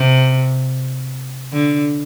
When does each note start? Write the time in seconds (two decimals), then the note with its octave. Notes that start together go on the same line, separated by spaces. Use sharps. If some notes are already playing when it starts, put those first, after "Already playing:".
Already playing: C3
1.53 D3